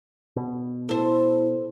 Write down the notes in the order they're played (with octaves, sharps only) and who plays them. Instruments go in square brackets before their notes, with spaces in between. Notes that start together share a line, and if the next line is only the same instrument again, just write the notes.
[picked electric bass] B2
[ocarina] E4 [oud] A4 C5